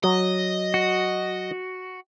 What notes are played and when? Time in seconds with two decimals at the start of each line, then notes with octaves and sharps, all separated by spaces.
0.04 F#3 D#5
0.74 F#4